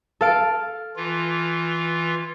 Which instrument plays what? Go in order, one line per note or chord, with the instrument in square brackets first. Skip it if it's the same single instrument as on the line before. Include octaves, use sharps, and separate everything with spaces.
[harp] A4 F5 D7
[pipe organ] E3 F4